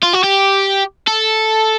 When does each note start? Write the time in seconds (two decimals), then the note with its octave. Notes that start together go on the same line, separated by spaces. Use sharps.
0.02 F4
0.13 F#4
0.23 G4
1.08 A4